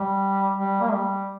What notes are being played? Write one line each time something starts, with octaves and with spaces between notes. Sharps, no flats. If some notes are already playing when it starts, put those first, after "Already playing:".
Already playing: G3
G3
A#3
G3